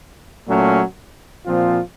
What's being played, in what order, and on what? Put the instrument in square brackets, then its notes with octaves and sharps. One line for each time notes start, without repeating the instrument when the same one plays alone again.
[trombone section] A#2 F#3 A3 C#4
A#2 F3 C4 F4